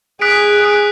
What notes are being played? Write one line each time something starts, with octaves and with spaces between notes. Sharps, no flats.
G#4 D#6 F#6 B6 D7
D#6 F#6 B6 D7